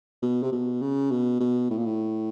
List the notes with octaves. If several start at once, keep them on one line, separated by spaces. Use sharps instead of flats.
B2
C3
B2
C#3
B2
B2
A2
A#2
A2